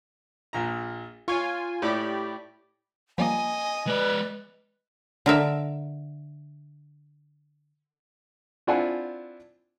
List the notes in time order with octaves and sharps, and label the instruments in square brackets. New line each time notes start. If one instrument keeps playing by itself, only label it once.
[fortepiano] A#1 A#2 A#5
[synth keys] F4 G#5 [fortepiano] C#5 C#6
[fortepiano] A2 [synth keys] G4 D5 B5
[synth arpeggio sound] F3 G3 A#3 [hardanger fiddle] D#5 [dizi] G#5
[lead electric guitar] G#3 D5 [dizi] B4
[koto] D3 A#4 E5
[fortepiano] C4 D4 E4 F4 F#5 G#5